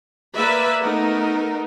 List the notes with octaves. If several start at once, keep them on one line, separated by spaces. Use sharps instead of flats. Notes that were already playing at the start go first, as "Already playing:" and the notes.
A#3 B4 D5 E5 B5
A3 B3 D#4 A#4